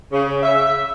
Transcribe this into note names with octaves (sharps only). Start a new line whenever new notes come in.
C#3
E5